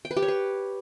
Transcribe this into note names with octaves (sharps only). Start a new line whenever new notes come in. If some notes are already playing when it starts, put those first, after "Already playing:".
G5
B4
G4
C#5
B4